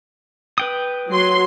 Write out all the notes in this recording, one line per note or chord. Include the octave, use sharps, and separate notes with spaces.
B4 G5 D#6
F#3 C6